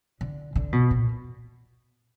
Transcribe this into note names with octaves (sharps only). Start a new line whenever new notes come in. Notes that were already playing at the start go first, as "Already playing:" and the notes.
D3
D3
B2
A#2